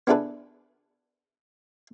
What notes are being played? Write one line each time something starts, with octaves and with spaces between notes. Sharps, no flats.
B3 D4 E4 G#4 A4 B4